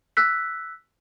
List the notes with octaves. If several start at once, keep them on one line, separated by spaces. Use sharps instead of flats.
E6 F#6 B6